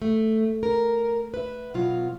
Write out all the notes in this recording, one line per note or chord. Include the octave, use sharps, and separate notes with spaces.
A3
A#4
B4 E5
B2 F#3 F4